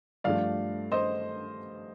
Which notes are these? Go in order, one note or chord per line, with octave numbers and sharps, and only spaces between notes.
G2 F3 A3 D5 F5
C5 D#5